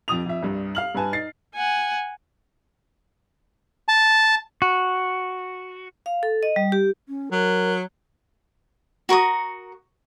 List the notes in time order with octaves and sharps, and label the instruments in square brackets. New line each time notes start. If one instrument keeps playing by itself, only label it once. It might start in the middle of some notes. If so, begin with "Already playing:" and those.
[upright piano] F2 F3 D#6 F7
F2 E5
C2 G2
F5 F6 F#7
G2 B4 G#5 A5
D#4 A6 C7
[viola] F#5 G#5
[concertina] A5
[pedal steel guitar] F#4
[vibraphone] F5
A4
D#5
G3
G4
[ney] C#4
[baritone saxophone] F#3 [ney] A#4
[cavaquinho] F#4 A#4 C#6 D#6